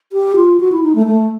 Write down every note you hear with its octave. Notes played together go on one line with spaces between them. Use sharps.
G4
F4
F#4
E4
D#4
A3
A3